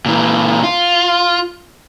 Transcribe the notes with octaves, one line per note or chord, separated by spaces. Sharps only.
A#2 E3
F4